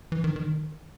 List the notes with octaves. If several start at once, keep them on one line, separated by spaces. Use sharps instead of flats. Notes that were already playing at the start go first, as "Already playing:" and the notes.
E3
D#3
D#3